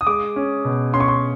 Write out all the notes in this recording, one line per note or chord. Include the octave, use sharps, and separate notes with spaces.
D#6
G#3 D6
C#4
B2
C#4 C6
C#6
C6